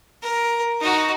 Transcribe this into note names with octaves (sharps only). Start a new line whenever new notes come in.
A#4
D#4 F#4